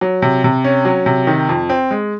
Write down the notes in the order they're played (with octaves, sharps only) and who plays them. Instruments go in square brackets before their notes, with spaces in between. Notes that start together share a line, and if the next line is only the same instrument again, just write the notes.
[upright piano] F#3
C3
C3
C#4
F#3
C3
D#3
F2
C4
G#3